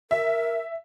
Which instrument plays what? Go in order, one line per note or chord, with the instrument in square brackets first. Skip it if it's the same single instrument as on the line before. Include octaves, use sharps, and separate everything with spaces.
[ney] A#4 [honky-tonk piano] E5